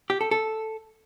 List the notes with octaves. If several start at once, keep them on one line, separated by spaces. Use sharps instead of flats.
G4
A4
A4